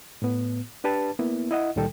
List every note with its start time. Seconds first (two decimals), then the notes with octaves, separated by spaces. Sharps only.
0.22 A2 B3
0.84 D4 G4 B4 A5
1.19 A#3 B3 E4
1.51 E4 D#5 F#5
1.76 C#2 A#2 D#3 G3 A4 G5